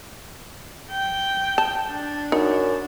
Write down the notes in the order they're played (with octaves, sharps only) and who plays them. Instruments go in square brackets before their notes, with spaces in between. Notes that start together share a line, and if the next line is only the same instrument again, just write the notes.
[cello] G5
[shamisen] A5
[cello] D4
[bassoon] F#2 [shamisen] D#4